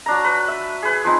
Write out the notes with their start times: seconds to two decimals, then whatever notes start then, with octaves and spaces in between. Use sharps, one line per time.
0.06 F#3 D4 A#5
0.24 B4
0.48 E5
0.82 G#4 B4
1.04 F3 C4 D#4